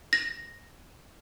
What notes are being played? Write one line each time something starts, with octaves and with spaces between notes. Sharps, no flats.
A#6